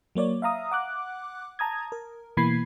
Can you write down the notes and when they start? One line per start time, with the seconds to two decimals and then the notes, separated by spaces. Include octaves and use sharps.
0.15 F#3 A#3 C#5 D5
0.42 E5 F5 A#5 D#6
0.71 F#5 D6 F#6
1.59 A5 A#5 D#6 G#6
1.92 A#4
2.37 B2 E3 A#3 B5 G#6 C7